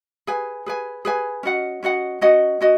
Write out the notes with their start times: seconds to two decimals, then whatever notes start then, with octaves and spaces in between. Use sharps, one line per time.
0.27 G#4 B4 G#5
0.66 G#4 B4 G#5
1.05 G#4 B4 G#5
1.43 C#4 F#4 D#5 F#5
1.83 C#4 F#4 D#5 F#5
2.21 C#4 F#4 D#5 F#5
2.61 C#4 F#4 D#5